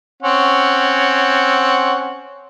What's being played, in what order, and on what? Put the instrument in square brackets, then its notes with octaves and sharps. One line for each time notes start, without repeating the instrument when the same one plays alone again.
[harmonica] C4 C#4 F#5